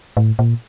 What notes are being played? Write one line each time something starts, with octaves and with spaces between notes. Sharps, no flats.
A2
A#2